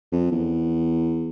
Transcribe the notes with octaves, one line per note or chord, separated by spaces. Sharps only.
F2
E2